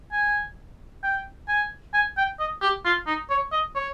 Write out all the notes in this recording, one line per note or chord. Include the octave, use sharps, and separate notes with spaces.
G#5
G5
G#5
G#5
G5
D#5
G4
F4
D#4
C#5
D#5
C#5